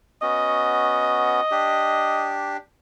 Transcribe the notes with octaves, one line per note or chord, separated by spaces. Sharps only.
B3 C#4 F#4 D#5
D4 G4